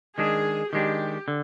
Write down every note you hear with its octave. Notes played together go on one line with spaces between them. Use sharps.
D#3 G#3 D4 G#4
D#3 G#3 D4 G4
D3